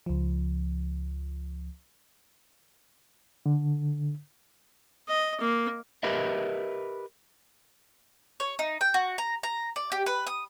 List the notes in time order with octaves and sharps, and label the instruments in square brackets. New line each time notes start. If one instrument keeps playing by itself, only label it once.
[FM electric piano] C#2 F3
[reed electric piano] D3
[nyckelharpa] D#5
A#3
[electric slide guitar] G4 A#4 B4 D#5 E5
[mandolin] C#5
D#4
G5
F#4
A#5
A#5
D5
G4
B4
D#6